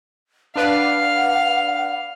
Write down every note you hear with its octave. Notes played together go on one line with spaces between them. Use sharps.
D4 B4 D5 F5 F#5